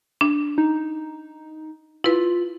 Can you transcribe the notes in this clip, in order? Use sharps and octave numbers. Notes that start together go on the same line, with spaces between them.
D4
D#4
E4 F4 B4